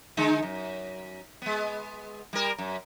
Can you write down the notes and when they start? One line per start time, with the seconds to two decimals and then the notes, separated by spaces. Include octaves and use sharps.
0.17 D3 G#3 D#4
0.43 F#2
1.42 G#3 B3
2.33 G3 A#4
2.58 F#2